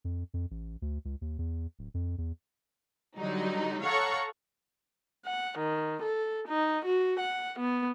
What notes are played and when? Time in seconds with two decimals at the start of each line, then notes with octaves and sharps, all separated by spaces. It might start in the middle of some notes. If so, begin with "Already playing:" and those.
0.05 F2
0.34 F2
0.51 A1
0.82 D2
1.05 C#2
1.21 D#2
1.39 E2
1.79 D1
1.94 F2
2.18 E2
3.18 D3 F#3 G3 D#4
3.83 A4 C#5 F5 F#5 A#5 C#6
5.26 F#5
5.60 D#3
6.04 A4
6.47 D#4
6.84 F#4
7.19 F#5
7.59 B3